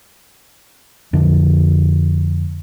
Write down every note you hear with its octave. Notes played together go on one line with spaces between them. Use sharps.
F2 D3